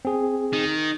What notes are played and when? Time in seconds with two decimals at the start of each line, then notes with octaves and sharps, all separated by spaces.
0.05 C4 G#4
0.53 D#3